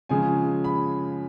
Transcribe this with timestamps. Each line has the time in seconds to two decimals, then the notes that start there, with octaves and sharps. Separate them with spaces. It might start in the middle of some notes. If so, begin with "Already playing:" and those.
0.09 C#3 F3 G#3 C#4 G#5
0.64 B5